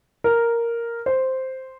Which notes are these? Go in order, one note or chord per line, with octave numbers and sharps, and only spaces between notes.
A#4
C5